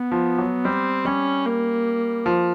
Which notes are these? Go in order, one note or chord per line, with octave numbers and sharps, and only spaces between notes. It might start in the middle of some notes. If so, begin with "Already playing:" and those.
Already playing: B3
F3
F#3
G3 C4
G3 C#4
A#3
F3